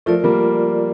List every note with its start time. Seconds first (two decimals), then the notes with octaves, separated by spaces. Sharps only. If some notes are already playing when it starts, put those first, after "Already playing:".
0.06 F3 A3 F4 A#4 D5
0.24 G3 A#3